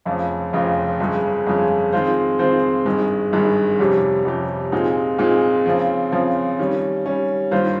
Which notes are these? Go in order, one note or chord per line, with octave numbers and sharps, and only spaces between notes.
F1 F2 C#3 F3
F1 F2 C#3 F3
G1 F2 C#3 G#3
G1 F2 C#3 G#3
D#3 G#3 C4 F4 C5
D#3 G#3 C4 F4 C5
G#1 G2 D#3 G#3
G#1 G2 D#3 G#3
F2 C3 G3 C#4 G4
F2 C3 G3 C#4 G4
A#2 G#3 C4 D#4
A#2 G#3 C4 D#4
C#3 F3 C4
C#3 F3 C4
D#3 G3 C#4
D#3 G3 C#4
G2 D#3 A#3 F4 C5